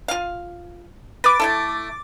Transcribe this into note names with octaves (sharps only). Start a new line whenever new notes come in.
F4 F5
B4 D6 A6
A3 E4 A4